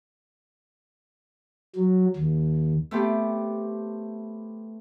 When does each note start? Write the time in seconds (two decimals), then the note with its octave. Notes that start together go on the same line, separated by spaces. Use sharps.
1.75 F#3
2.16 D#2
2.91 A3 B3 C4 G4